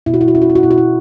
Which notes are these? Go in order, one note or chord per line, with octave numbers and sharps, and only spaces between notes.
B2 E4
F#4
E4
F#4
C#4 E4
F#4
E4
F#4
B2 E4
F#4
E4